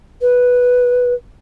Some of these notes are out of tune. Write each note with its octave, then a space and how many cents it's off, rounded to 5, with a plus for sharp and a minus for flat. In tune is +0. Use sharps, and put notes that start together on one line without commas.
B4 -5